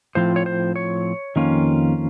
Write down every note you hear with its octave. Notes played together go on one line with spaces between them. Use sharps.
A2 F3 C4 F4 C5
C#5
C5
C#5
F2 D#3 A#3 C#4 F4